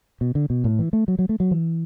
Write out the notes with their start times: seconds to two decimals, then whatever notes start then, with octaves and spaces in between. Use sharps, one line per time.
0.21 B2
0.35 D3
0.50 B2
0.64 A2
0.79 E3
0.93 A3
1.08 F#3
1.19 F#3
1.29 A3
1.40 F#3
1.51 E3